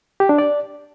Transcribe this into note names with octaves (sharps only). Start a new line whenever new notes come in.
G4
D4
D5